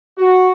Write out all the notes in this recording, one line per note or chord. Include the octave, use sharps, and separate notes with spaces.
F#4